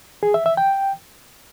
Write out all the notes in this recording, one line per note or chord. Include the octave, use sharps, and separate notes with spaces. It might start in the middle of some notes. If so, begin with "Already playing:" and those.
G#4
E5
E5
G5